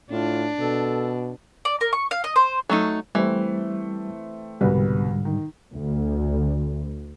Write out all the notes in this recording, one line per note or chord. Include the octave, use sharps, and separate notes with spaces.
A2 D4 F4
B2 A4
D5
A#4
C#6
F5
D#5
C5
F#3 A3 D#4
E3 G3 A3 C4
C2 G#2 B2 D3 G3 B4
D#3
D2